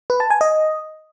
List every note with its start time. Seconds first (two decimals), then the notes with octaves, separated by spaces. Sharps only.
0.10 B4
0.20 A5
0.30 G#5
0.41 D#5